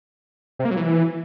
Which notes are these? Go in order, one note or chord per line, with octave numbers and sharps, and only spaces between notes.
C3
A#3
F#3
E3